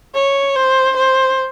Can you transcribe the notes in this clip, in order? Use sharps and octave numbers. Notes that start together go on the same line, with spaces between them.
C#5
C5
C5